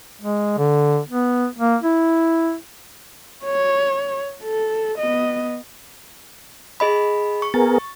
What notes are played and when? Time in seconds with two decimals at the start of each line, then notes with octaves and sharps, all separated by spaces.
0.22 G#3
0.58 D3
1.09 B3
1.59 A#3
1.83 E4
3.45 C#5
4.43 A4
4.98 B3 D#5
6.80 G#4 D#5 B5
7.42 C#6
7.54 B3 G#4 A#4 A6